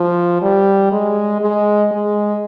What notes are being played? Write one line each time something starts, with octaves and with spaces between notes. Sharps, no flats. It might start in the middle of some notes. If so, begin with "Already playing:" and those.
Already playing: F3
G3
G#3
G#3
G#3